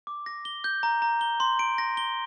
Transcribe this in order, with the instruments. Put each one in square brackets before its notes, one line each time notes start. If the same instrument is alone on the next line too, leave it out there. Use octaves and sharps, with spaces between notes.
[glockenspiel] D6
A#6
G7
G6
A#5
A#5
G7
C6
D7
A#6
G7